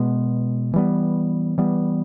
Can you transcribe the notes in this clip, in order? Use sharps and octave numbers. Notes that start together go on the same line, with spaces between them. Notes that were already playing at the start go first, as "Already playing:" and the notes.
Already playing: B2 G#3 B3
E3 G3 B3
E3 G3 B3